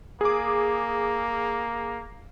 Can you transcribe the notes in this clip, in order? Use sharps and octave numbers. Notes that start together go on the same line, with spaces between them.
A#3 G#4 D6